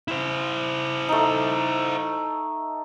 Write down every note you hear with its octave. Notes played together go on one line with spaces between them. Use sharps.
E4 C5
A3 D#4